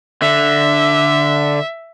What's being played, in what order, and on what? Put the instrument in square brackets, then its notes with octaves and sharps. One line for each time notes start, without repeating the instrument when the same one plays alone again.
[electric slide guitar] D3 [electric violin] E5